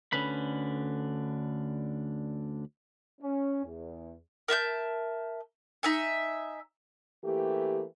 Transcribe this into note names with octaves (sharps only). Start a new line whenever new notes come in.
D2 D3 C#4 B4 B5
C#4
E2
A#4 E5 A5 G6
D#4 E5 G#5
E3 A3 A#3 G4